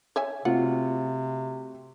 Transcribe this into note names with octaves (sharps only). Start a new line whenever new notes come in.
C#5 E5 G#5
C3 A3 C4 F4 F#4 F#5